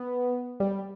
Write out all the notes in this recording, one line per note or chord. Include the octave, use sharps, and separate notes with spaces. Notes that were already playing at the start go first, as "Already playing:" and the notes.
Already playing: B3
G3